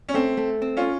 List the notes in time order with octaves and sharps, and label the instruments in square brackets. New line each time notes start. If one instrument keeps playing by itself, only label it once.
[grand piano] C#4
[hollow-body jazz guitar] A3 [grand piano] C4
[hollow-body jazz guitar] A3
C4
[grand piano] C#4 F4